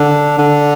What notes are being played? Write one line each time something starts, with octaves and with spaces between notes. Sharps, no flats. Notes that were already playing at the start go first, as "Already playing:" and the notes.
Already playing: D3
D3